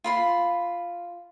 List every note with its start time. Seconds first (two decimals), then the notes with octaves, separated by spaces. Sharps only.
0.04 F4 B5 C6